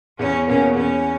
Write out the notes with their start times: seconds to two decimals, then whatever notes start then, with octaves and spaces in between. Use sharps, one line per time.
0.19 E2 C#4
0.47 B2 A#3 C#4
0.75 E2 C#4